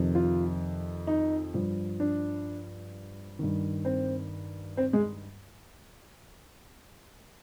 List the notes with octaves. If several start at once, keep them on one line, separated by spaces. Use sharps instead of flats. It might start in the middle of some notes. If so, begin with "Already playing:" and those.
Already playing: F2 C3 D#3
F4
D#4
G2 F3
D4
G2 D#3
C4
C4
G#3